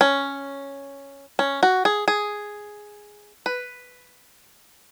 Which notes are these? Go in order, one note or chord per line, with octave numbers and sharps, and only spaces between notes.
C#4
C#4
F#4
G#4
G#4
B4